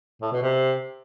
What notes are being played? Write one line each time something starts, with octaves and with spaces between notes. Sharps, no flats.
A2
B2
C3